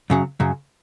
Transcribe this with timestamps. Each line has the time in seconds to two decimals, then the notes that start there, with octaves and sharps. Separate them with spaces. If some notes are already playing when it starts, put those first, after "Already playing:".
0.10 F#2 C#3 F#3
0.40 F#2 C#3 F#3